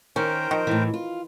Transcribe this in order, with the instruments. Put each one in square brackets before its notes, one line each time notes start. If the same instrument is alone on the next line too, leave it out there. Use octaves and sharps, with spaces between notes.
[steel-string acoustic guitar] D#3 [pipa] C#4 [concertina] A#4 C5 G5
[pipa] D#3 [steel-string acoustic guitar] F3
[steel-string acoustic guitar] A2 E3
F4